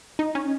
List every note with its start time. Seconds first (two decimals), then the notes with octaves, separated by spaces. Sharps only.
0.19 D#4
0.35 C#4